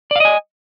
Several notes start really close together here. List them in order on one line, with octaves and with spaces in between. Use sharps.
D5 F5 D#5 G#5